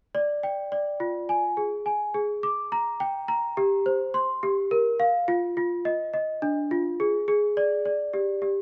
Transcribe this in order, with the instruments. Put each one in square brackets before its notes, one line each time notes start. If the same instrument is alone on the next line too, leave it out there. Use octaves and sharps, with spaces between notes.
[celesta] D5
G5
D5
F4
G#5
G#4
G#5
G#4
D6
A#5
G5
A#5
G4
C5
C6
G4
A#4
F5
F4
F4
D#5
D#5
D4
F4
G#4
G#4
D5
D5
G4
G4